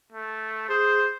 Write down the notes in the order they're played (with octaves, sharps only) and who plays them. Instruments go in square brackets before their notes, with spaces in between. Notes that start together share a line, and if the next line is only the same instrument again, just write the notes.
[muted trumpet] A3
[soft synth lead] G#4 [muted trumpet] C5